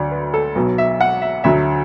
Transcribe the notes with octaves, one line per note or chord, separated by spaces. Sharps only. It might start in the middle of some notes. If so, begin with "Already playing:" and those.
Already playing: D2 D3 F#3 D5
B4
A4
B1 B2 F#3 B4
E5
F#5
E5
D2 D3 F#3 E5